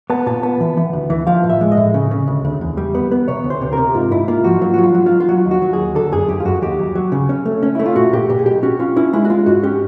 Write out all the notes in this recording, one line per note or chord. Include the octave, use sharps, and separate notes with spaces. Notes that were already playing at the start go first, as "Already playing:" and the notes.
B3 A5
A#2 A5
B3 A5
E3
E3
D2
E3
F3 F5
A2
E5
G#3
D#5
A2
C#3
C#3
D2
D2
E2
G3
B3
B3
C3 C#5
D2
C5
C3
C3 A#4
G#2 F4
G#2 E4
A#3 F4
F3 F#4
F#3 F4
F#3 F#4
F4
F#3
F4
F#3
F4
F#3 F#4
D#2
F#4
F#3
G#4
D#2
D3 A4
F#2 G#4
F#2 G4
F4
F#2 F#4
D#2 G4
F#3
F#3
C#3
C#4
A3
C#4
A3 E4
F4
A#2 F#4
A#2 G4
A#2 G4
G#4
B1 G4
C#4 F#4
C#4 F4
C#4 E4
G#3 E4
F#4
G#3 F4
G#2 F#4
C#4 G4